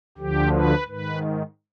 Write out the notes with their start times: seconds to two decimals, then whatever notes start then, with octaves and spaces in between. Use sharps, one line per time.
0.18 D2 D3 F3 G4
0.53 B4
0.87 G#2 D#3 B4